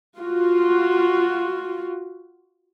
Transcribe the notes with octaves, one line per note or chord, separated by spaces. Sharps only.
F4 F#4